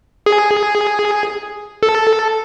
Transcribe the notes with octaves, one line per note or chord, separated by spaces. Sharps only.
G#4
A4